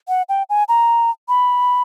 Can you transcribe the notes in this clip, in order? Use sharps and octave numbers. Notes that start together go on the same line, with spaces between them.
F#5
G5
G#5
A#5
B5